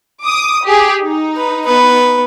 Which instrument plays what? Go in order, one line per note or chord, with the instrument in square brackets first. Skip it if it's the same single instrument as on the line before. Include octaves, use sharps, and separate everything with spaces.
[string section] D6 D#6
G4 G#4
D#4
[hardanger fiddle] B4
B3 B4